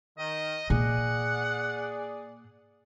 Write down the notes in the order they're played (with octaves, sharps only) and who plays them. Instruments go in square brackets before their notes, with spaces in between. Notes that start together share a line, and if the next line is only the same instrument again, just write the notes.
[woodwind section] D#3 [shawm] D#5
[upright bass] A#2 [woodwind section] G#4 D5 [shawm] F#5